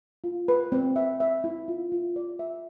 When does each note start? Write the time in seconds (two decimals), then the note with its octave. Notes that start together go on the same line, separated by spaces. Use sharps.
0.24 F4
0.48 B4
0.72 C4
0.96 E5
1.20 E5
1.44 E4
1.68 F4
1.92 F4
2.16 D5
2.39 E5